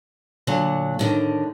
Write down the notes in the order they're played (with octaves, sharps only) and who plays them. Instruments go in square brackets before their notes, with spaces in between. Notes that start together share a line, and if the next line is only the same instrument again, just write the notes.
[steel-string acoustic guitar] A#2 D3 F#3
A2 D3 D#3